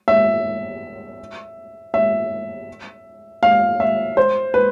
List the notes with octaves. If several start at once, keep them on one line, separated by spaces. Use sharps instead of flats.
E5
E5
F5
E5
C5
B4